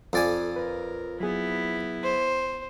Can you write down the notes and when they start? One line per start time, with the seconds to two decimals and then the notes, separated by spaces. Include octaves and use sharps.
0.13 F2 A4 D5 G#5
0.56 A#4 B4
1.20 F#3 B3 E4 G#4
2.04 C5